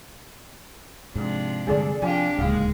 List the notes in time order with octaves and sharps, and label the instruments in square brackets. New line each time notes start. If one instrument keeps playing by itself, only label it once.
[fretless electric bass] G#2 [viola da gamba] C3 F3 D4
[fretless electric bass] G2 D3 G#3 [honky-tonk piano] G#4 A4 D5
[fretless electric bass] F3 [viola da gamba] C4 D4 G4 [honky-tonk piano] F5 G#5
[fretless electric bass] D1 C#2 G#2 [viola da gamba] G#3 A#3 [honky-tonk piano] F5